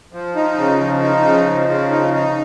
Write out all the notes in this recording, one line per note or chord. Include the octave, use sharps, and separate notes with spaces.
F3
D#4
C#3
F3
D#4
C#3
F3
C#3
D#4
D#4